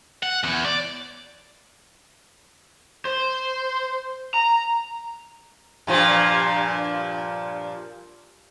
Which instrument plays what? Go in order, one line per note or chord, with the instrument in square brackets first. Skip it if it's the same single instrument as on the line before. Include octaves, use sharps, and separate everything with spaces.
[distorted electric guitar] F#5
E2
D5
[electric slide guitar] C5
A#5
[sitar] G2 A#2 F3